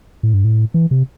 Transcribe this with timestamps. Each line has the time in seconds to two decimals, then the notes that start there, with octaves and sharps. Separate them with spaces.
0.23 A2
0.34 G2
0.44 A2
0.74 E3
0.91 C3